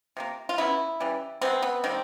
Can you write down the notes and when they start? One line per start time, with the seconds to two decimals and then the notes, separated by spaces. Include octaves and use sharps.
0.17 C3 F3 A#3
0.49 F4
0.58 C#3 F#3 B3 E4
1.00 C#3 E3 G3
1.41 C3 E3 G#3 B3 C4
1.62 B3
1.84 D#3 G3 A#3 C4